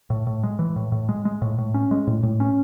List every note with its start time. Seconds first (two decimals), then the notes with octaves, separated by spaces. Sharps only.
0.10 A2
0.27 A2
0.43 G#3
0.59 E3
0.76 A2
0.92 A2
1.09 G#3
1.25 G#3
1.42 A2
1.58 A2
1.74 C#4
1.91 G#3
2.07 A2
2.23 A2
2.40 C#4